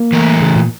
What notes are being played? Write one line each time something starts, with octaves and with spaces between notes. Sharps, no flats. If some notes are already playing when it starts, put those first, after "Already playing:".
Already playing: A#3
E3 A3 E4 A#4
C#3
A#2